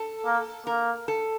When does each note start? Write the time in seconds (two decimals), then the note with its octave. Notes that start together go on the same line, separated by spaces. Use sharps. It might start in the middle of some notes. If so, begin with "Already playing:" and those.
Already playing: A4
0.26 A#3
0.67 A#3 A#4
1.08 A4